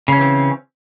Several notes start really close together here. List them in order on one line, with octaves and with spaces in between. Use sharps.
C#3 C#4 E3 C4